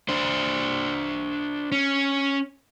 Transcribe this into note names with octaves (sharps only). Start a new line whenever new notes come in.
D4 C5
C#4